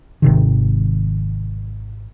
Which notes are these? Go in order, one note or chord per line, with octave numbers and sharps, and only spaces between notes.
G#1 C3 D#3